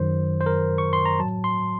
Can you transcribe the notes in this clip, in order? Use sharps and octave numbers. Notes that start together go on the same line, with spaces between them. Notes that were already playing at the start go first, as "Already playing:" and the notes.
Already playing: F#2 D#3 F#3 C5
C5
A#4
C#6
C6
A#5
A2 F#3 A5
C6